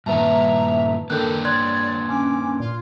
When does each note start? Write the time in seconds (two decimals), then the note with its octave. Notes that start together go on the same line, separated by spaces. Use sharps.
0.06 G2 A#2 D#3 B4 E5 A5 A#5
1.10 D#3 A#3 D4 A4 B4 F#6 G6
1.45 C#5 D5 C6 F#6 G#6
2.09 C#4 D6
2.60 A#2 F4